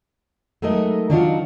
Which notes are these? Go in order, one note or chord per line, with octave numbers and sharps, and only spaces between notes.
F#3 G#3 A3 D#4 A#4 D#5
D#3 F#3 D4 D#4 F4 F#4